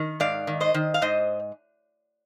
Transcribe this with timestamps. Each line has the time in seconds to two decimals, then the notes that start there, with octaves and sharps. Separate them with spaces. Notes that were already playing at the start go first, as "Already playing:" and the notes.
Already playing: D#3
0.20 G#2 D5 F5
0.47 D#3
0.61 C5 D#5
0.75 D#3
0.94 F5
1.02 G#2 C5 D#5